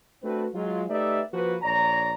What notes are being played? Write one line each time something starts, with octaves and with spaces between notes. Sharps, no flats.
A3 C4 D4 F#4 B4
F#3 G#3 F4
A3 D#4 G4 B4 D5 E5
F3 A#3 F#4 B4
A#1 C#5 D5 A#5